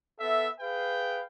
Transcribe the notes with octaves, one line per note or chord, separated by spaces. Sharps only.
B3 A4 E5
G#4 B4 F5 G5